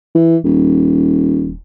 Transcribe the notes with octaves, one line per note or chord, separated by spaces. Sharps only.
E3
D#1